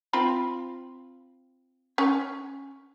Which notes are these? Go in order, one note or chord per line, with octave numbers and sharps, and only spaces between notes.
C4 F4 B5
C#4